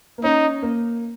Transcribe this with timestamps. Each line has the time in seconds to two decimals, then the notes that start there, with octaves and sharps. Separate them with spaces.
0.18 A#3
0.24 C#4 D#4
0.62 A#3